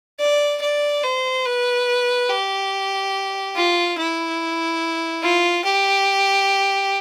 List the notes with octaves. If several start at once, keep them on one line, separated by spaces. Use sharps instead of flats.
D5
D5
C5
B4
G4
F4
E4
F4
G4